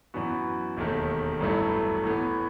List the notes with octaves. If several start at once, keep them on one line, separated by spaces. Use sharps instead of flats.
F#2 E3 B3 F#4
E1 D#2 D#3 A3
A1 G2 F#3 A3 E4
A2 E3 B3